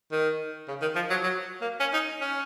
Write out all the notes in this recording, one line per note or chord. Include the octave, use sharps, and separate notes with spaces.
D#3
C#3
D#3
F3
F#3
F#3
A#3
C#4
D#4
C#4